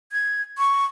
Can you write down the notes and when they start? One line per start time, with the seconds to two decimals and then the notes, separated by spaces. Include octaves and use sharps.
0.12 G#6
0.58 C#6